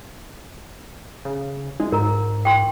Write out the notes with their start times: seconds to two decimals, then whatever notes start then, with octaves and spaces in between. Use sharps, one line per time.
1.25 C#3
1.80 G#3 D#4
1.92 G#2 A#4 A#5
2.45 G5 C6